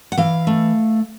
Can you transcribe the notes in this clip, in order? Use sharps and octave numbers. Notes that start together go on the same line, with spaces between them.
F#5
E3 F5
A3